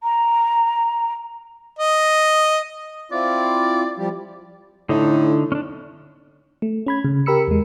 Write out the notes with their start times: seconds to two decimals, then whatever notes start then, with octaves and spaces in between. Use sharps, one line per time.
0.03 A#5
1.79 D#5
3.12 C4 E4 F4 D5
3.98 F3 G3 G4
4.89 A2 D3 D#4
5.52 C#4 D4
6.62 A3
6.86 C#4 B5 G#6
7.05 C#3
7.26 G4 A#4 B5 E6 C#7
7.48 E2 G#3